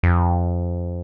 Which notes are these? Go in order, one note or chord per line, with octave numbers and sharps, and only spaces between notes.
F2